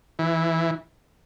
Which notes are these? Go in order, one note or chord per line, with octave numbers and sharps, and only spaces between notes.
E3